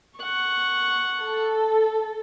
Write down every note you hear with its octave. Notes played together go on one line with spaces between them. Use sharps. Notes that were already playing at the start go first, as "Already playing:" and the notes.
F#5 C#6
A4